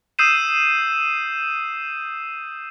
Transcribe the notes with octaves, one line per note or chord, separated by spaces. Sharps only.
D#6 E6 G6 C7 D#7 E7